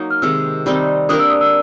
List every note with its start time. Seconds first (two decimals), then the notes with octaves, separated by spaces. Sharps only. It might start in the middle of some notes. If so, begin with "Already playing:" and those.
Already playing: F#3 A#3 D#4
0.11 F6
0.22 C3 D#3 G#3 E6
0.66 D#3 G3 C4 D#4
1.09 A#3 D4 G4 A#4 D#6
1.19 E6
1.30 D#6
1.41 E6